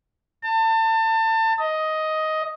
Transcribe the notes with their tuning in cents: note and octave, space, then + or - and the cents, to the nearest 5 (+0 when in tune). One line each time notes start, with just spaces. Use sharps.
A5 +30
D#5 +10